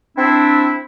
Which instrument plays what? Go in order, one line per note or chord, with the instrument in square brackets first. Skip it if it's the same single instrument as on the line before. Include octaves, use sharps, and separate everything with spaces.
[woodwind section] C4 D4 E4